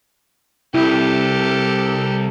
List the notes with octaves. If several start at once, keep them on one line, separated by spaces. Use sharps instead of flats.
C2 E4 G4 A4